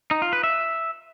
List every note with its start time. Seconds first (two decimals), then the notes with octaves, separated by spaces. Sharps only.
0.11 D#4
0.22 F4
0.33 B4
0.44 E5